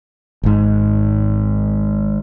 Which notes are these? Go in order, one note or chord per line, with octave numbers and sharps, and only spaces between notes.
G#1 G#2